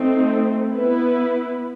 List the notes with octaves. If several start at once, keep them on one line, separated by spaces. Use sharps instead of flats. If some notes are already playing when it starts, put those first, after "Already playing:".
Already playing: A3 C4 D#4
B3 E4 B4